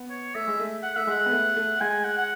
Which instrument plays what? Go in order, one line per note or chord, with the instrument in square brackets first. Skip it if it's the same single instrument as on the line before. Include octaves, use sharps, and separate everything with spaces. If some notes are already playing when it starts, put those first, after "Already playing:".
Already playing: [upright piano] B3
[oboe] C#5
[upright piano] A3 [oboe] E5
[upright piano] G#3
A3
[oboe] F#5
[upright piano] A3 [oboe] E5
[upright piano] G#3 [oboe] F#5
[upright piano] B3
A3
A3
[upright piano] G#3 [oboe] G#5
[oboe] F#5
F#5